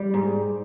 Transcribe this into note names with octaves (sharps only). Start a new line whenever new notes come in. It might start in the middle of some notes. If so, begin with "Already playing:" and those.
Already playing: G3
G#2